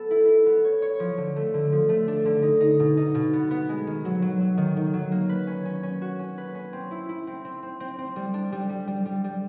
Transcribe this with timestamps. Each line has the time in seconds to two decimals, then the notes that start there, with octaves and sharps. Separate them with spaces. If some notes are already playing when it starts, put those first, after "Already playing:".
Already playing: B3 A4
0.11 E4
0.28 E4
0.46 B3
0.65 C#5
0.82 C#5
1.00 F3
1.17 D3
1.36 A3
1.54 D3
1.72 F3
1.89 A3
2.08 D4
2.25 D3
2.43 D#4
2.61 D#4
2.79 B2
2.97 D#4
3.15 B2
3.33 B3
3.51 B3
3.69 G#3
3.87 D#3
4.05 F#3
4.22 F#3
4.40 F#3
4.57 D#3
4.77 D#3
4.94 F#3
5.11 A#3
5.29 B4
5.47 C#4
5.65 C#4
5.83 C#4
6.02 F#4
6.19 C#4
6.38 B4
6.55 C#4
6.73 C4
6.91 E4
7.09 E4
7.27 C4
7.45 C4
7.63 C4
7.80 C4
7.98 C4
8.16 G3
8.34 D4
8.52 G3
8.69 G3
8.87 G3
9.06 G3
9.24 G3